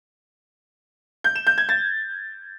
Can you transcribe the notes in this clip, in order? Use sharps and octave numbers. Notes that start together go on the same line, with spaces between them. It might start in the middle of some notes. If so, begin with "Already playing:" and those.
G6
E7
G6
G#6
A6